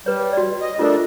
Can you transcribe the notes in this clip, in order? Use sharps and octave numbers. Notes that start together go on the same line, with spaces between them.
G3 B4 C#5
F#4 D5
D#5
A3 D4 F4 A4 A#4